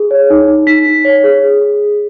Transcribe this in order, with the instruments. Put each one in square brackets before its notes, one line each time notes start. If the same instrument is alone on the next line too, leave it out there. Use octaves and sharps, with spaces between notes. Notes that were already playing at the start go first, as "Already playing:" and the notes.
Already playing: [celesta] G#4
C#5
D#4
D#4
D#4 B6
D#4
C#5
G#4
G#4
G#4